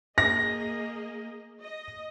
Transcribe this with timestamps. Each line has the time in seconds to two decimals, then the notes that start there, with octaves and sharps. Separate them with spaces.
0.18 A#3 G#4 D#5 A#6
1.62 D#5